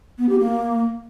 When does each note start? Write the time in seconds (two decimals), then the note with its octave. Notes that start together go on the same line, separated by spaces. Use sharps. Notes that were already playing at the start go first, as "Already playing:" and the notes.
0.18 B3
0.29 G4
0.40 A#3